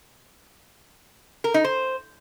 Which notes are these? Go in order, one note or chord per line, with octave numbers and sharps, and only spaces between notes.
A#4
D#4
C5